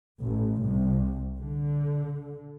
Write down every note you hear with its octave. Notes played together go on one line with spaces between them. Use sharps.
A1
C2
D3